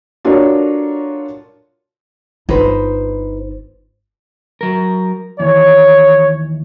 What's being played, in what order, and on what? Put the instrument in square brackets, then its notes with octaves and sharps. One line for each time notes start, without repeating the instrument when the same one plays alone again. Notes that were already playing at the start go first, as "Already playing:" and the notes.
[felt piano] D4 F4 F#4 A4 A#4 C#5
[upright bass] G1 F4 [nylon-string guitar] D#4 B4 C5
[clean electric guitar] F#3 A#4
[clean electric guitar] D#2 E3 [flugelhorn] C#5